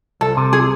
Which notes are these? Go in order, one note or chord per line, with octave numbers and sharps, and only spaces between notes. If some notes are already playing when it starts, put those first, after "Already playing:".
C2 A4
C3
G#4